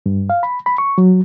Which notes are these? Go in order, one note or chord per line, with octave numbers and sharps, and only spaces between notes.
G2
F5
B5
B5
C#6
F#3